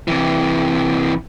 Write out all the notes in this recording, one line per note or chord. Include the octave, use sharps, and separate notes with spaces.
C3 E3